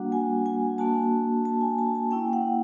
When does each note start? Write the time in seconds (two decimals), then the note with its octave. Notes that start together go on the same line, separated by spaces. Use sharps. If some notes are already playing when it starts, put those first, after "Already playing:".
Already playing: G3 A#3 D4 F#4 F#5
0.12 G#5
0.46 G#5
0.78 A#3 D4 F#4 A5
1.45 A5
1.61 G#5
1.78 A5
1.95 A5
2.11 A#3 C#4 E4 G5
2.33 F#5